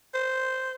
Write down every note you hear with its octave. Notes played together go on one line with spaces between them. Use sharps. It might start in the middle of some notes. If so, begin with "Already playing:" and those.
C5